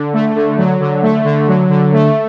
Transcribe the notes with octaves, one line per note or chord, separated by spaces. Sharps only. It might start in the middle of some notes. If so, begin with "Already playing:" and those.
Already playing: D3
A3
D3
F#3
D3
A3
D3
F#3
D3
A3